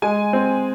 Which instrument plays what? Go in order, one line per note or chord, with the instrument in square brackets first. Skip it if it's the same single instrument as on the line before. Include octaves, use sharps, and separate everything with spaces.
[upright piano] G#3 G#5
C4